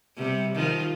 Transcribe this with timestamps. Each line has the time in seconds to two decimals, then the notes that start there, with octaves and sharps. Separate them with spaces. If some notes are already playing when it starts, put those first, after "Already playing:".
0.16 C3 G3
0.55 D#3 F3 F4